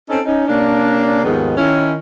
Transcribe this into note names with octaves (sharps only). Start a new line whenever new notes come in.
C4 C#4 D#4 A4
C#4 D#4
C3 A#3 C#4 D4
D#2 G#2 D#3 F3 B3 D#4
D#3 C#4 E4